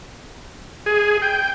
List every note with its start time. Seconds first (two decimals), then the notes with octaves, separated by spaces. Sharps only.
0.86 G#4
1.22 G5